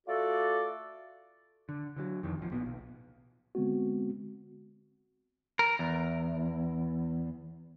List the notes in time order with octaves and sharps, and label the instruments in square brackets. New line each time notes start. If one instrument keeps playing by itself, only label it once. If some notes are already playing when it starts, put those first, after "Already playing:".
[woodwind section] A3 F4 F#4 A4 D5
[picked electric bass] D3
D3 D#3 F#3
F2 D#3 E3
D1 F3
A#1 A#2 B3
B1
[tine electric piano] D3 G#3 B3 C4 F#4
[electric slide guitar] A#4
E2